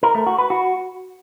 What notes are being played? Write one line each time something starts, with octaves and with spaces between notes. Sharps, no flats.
A#4
A3
F#4
B4
F#4